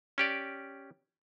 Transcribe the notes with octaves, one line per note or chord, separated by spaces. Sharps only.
C#4 G4 D5